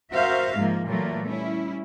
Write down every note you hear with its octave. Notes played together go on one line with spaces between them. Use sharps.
F#4 A#4 C5 E5 F5
G#2 F3 A#3
A#2 E3 F#3 A3 A#3
G3 C#4 E4